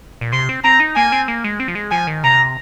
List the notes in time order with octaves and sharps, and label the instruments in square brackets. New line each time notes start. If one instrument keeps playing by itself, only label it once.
[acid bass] A#2
[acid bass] C3 [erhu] C6
[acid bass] C4
[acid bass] C4 [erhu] A#5
[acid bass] D#4
[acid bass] A#3 [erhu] G#5
[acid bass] C4
A#3
G#3
C4
F3
G#3
[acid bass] F3 [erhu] G#5
[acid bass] D#3
[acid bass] C3 [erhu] A#5